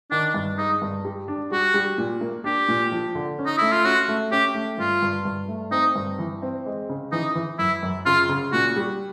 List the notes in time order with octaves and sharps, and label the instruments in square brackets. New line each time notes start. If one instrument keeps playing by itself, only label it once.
[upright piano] D#3 [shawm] D4
[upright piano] G2
[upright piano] G#3 [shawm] D#4
[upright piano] G2
G3
D4
[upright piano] G3 [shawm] F#4
[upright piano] G3
A#2
A#3
[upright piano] D4 [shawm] G4
[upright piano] A#2
F3
D3
C#4
[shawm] D#4
[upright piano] A3 [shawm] E4
[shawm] F4
[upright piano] C#4 [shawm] F#4
[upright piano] A3
[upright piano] C#4 [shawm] G4
[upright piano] A3
[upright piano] G2 [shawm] F4
[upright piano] G2
G2
A3
[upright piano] C4 [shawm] D#4
[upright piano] G2
E3
C4
G#3
C#3
[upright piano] E3 [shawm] D#4
[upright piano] E3
[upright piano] F#2 [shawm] E4
[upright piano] F#2
[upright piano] C#3 [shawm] F4
[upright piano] C#3
[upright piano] A#2 [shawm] F#4
[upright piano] G3